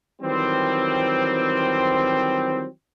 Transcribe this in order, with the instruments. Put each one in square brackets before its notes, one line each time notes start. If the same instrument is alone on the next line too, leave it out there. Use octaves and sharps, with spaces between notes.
[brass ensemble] D#3 E3 F#3 G3 C4